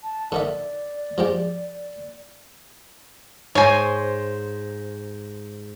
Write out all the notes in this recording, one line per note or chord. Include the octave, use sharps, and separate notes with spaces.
A5
D3 D#3 D5 E5
F3 G#3 G4
G#2 C5 C#5 G#5